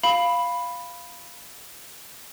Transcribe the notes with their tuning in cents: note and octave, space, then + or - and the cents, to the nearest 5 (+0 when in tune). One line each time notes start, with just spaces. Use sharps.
F5 +0 B5 +0